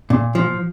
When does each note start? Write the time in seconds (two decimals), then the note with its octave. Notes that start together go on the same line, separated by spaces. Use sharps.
0.10 A#2
0.35 F3